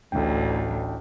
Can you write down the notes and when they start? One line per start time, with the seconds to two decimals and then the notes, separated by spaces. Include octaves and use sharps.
0.12 A1 D2 A2 D4 G5